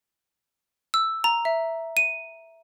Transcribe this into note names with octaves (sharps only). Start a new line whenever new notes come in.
E6
A#5
E5
D#7